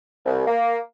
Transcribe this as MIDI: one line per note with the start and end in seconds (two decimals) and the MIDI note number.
0.25 0.45 36
0.46 0.77 58